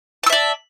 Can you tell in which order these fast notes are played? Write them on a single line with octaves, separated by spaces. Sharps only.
A5 E6 E5 D5